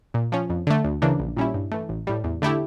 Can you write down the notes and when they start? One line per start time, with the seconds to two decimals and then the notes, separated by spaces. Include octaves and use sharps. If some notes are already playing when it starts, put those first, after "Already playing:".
0.14 A#2
0.32 F3 C#4
0.50 F2
0.67 D3 A3
0.84 D2
1.02 C#3 E3 A#3 D4
1.19 A#1
1.37 A#2 G3 C#4 E4
1.54 G2
1.72 E3 A3
1.89 A1
2.07 A2 G3
2.24 E2
2.42 D3 A3 E4 G4